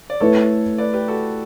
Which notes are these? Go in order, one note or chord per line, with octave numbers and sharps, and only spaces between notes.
D5
A3 E4 A4 B4 C#5
B4 D5
G4 B4
F#4 A4